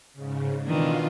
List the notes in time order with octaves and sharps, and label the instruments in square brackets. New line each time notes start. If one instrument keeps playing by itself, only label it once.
[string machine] G#2 C#3
[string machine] B2 F4 [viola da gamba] D#3 E3 D4